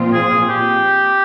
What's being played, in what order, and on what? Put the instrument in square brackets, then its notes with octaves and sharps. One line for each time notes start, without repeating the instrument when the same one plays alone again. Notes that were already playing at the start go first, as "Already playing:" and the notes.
Already playing: [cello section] A#2 F3 C4 F4
[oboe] G#4
G4